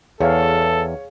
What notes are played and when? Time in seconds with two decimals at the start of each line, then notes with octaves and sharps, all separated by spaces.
0.21 E2 G#4 A4 C#5 F5